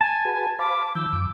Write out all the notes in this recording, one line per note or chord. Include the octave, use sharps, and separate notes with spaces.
G#5 A5
F#4 G#4 B4
C5 F5 B5 D6
D#3 F3 E6 G6
F#2 D6